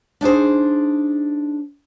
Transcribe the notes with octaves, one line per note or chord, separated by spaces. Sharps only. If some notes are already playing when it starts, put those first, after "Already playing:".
D4 D#4 G#4 C5